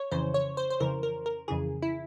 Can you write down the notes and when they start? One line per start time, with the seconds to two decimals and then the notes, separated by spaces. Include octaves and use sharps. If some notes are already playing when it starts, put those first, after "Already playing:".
Already playing: C#5
0.11 F2 C#3 E3 C5
0.34 C#5
0.57 C5
0.70 C5
0.80 F2 C#3 E3 A#4
1.03 A#4
1.26 A#4
1.48 F2 C#3 E3 G#4
1.82 E4